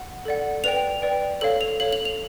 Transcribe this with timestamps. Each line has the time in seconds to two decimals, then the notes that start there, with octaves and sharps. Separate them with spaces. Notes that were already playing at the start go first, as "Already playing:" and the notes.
Already playing: F#5
0.25 A4 D5 F#5
0.64 B4 D5 G5 F7
1.02 B4 D5 G5
1.41 A4 C#5 F5 F#7
1.61 F7
1.80 A4 C#5 F5 F#7
1.93 F#7
2.05 F7